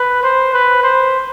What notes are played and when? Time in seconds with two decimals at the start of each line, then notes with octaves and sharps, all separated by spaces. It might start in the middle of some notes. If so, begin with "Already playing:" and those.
Already playing: B4
0.23 C5
0.53 B4
0.83 C5